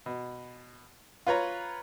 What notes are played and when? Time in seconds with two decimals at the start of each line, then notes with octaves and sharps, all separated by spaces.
0.06 B2
1.27 F4 B4 C#5 A#5